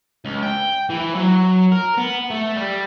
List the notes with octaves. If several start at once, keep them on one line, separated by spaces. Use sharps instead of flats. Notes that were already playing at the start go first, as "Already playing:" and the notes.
C#2
G5
E3
F#3
A#4
B3
A3
G3